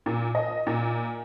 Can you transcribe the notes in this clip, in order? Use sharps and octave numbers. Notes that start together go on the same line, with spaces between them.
A#2
D#5
A#2